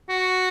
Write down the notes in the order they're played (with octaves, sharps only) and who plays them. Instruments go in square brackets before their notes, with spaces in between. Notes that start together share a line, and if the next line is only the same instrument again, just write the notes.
[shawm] F#4